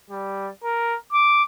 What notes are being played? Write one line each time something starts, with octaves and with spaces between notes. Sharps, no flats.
G3
A#4
D6